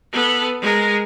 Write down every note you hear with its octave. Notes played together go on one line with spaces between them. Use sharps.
B3 A4
G#3 A#4